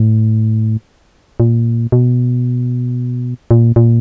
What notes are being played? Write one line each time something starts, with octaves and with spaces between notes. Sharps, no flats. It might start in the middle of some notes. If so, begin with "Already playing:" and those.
Already playing: A2
A#2
B2
A#2
A#2